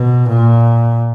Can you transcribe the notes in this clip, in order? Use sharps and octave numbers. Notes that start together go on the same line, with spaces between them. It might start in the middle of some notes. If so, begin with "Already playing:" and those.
Already playing: B2
A#2